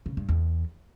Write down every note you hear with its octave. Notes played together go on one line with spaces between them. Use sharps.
C#3
G2
E2